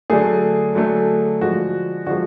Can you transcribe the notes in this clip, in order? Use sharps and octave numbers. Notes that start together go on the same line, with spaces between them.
D3 F#3 A3 G#4
D3 F#3 A3
D3 F3 G#3 F#4
D3 F3 G#3 F#4